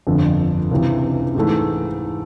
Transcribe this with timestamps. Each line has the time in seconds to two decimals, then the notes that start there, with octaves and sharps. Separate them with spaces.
0.07 G1 F2 D3
0.71 C#2 C3 E3
1.35 G#2 E3 A3